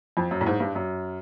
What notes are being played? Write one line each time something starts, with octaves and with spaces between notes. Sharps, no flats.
F2
F#2
A2
G#2
G2
F#2